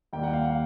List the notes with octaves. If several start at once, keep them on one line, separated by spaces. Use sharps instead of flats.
D#2 D#3 G3 A#3 G5
F#5
F5
F#5